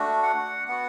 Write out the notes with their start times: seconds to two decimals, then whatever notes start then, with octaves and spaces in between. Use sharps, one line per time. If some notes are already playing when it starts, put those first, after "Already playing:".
Already playing: A3 D4 F#4
0.23 F#5
0.68 B3 F#4 F#5